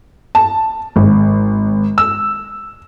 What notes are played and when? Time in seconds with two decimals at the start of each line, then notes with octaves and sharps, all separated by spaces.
0.35 A5
0.96 G#1
1.98 E6